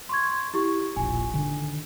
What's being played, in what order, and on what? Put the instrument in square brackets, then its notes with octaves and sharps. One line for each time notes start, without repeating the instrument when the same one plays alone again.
[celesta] C6 C#6 G#6
E4 G4 C#6
[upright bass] E1 A#1 [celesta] G#5
[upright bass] D3 D#3